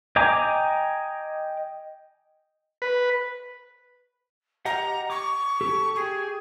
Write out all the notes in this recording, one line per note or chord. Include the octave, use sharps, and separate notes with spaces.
D#5 G5 G#5 A#5 D6
B4
G4 D#5 F#5 A#5
C#6 D6
G4 A4
G4 G#4